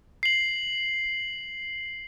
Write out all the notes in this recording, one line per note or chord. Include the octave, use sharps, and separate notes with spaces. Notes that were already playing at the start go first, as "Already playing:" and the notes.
C7 F#7